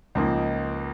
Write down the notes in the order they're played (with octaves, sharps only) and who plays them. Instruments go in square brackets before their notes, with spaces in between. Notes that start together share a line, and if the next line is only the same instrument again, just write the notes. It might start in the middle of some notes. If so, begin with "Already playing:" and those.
[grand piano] C#2 C#3 F3 A#3 D#4